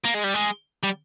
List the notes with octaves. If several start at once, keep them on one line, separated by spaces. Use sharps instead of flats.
A#3
G#3
G3
G#3
G3